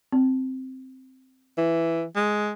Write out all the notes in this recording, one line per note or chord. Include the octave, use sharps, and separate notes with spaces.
C4
E3
G#3